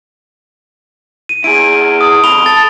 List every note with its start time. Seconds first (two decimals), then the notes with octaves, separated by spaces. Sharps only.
1.29 D#7
1.44 E4 G#4 D7
2.01 D#6
2.23 F2 B5 F7 G7
2.46 A4 A6